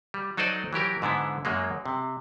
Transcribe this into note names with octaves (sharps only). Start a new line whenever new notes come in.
G3
F#3 D#4 A4 C5 D5 D#5
E3 F#3 G4 A#4
G#2 D3 B3 E4
F#2 F#3 G#3 A#3
C3